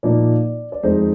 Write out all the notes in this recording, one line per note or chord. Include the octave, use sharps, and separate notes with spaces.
A#2 F3 A#3 D#4 D5
D5
F2 D#3 G#3 D#4 C5